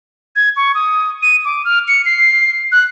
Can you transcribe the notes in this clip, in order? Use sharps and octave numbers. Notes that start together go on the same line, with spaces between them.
G#6
C#6
D#6
D#7
D6
F6
C#7
C7
F#6